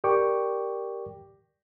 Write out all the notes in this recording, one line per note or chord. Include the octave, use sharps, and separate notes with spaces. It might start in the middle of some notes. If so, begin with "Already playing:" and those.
G4 A#4 D5 G5 C#6 D6